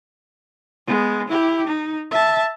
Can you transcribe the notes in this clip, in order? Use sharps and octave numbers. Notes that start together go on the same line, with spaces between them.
G#3 B3
E4 G4
D#4
E5 A5